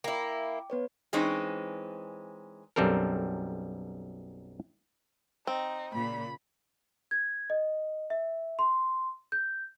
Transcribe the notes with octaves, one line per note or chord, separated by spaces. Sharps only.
A#3 E4 G5 D6
B3 B4 C#5
E3 G#3 C4 C#4 D#4
B1 F#2 G3 C4 A4 A#4
C4 D#4
A#2 C#3 B5
G#6
D#5
E5
C6
G6